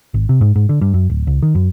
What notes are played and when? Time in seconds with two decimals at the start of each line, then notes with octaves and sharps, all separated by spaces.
0.14 G#1
0.29 C3
0.41 G#2
0.56 G#2
0.69 D3
0.81 G2
0.94 F#2
1.10 D1
1.27 C#2
1.43 D#3
1.55 F#2